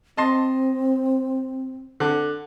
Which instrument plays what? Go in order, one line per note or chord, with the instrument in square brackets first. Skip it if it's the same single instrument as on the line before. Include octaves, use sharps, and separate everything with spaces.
[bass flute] C4 [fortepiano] D#5 A5 C6
[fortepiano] D3